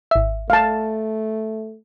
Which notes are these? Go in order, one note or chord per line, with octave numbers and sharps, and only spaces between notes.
G#1 E5
A3 F5 A5